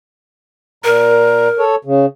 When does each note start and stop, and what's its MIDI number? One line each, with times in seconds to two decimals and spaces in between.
0.84 1.48 46
0.84 1.63 70
0.84 1.48 82
1.59 1.75 69
1.59 1.75 73
1.85 2.06 49